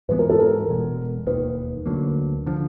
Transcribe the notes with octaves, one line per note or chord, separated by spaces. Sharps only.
G#2 E3 G#3 B3 B4
A#4
A4
A#4
E1 E2 B2 G#3
E1 D#2 D#3 B4
D2 D3 F#3 A#3
D3 F3